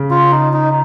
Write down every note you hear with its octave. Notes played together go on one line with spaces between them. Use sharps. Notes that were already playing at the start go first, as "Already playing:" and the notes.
Already playing: C#3
F4
D#4
D#4